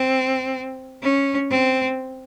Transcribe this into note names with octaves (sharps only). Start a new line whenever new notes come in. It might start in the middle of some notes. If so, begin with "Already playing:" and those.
Already playing: C4
C#4
C4